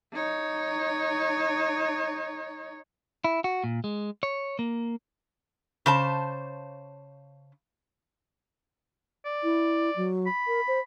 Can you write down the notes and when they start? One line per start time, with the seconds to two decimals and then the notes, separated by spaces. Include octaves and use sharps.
0.13 D#4 C#5
3.24 E4
3.44 F#4
3.64 A#2
3.84 G#3
4.23 C#5
4.59 A#3
5.86 C#3 C5 A5
9.26 D5
9.43 E4
9.96 F#3
10.27 B5
10.47 A#4
10.68 C5